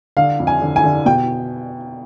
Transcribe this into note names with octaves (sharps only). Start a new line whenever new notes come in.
D3 F5
F2
G#5
D3
G#5
D3
B2 G5